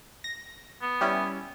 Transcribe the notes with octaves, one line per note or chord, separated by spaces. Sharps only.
A#6
B3
G3 C#4 E4